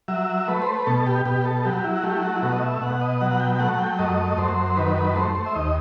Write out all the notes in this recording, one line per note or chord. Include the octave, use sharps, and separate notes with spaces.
F#3 E5
A3 B4
C5
B4
B2 A4
G4
B2 G4
A4
F#3 G4
E4
F#4
A3 G4
E4
F#4
E4
B2 F#4
D#5
E5
B2 F#5
D#5
F#3 F#5
F#5
G5
G5
A3 F#5
F#5
G5
F#2 D#5
F#2 C5
D#3 B4
B4
A3 C5
C5
E5
D#2 D#5